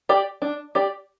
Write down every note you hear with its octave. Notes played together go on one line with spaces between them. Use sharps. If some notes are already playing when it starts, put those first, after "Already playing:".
G4 D5
D4
G4 D5